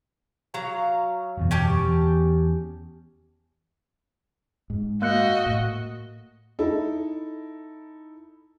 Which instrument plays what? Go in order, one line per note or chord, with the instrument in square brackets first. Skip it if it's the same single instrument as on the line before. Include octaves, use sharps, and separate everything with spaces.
[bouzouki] F#3 F5 A#5
[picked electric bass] F#1 E2 B2
[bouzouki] C#4 G4 A5
[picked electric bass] E2
[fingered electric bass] G#2
[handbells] A#3 F#6 C#7 [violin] F#4 D#5
[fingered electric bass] A2
[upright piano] D#4 E4 A4